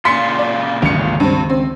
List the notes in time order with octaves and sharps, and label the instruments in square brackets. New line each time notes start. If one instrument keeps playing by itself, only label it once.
[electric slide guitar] A#2 C#3 F4 [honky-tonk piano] C6 B6 C#7
[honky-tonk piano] D5
[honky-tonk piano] G1 C#7 [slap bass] C#2 D#3 F#3
[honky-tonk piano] G2 C4
C4